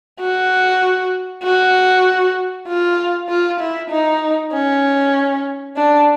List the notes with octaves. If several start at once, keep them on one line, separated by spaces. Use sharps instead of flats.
F#4
F#4
F4
F4
E4
D#4
C#4
D4